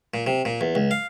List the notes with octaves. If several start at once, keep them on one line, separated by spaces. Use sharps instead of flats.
A#2
C3
A#2
E2
C#2
F5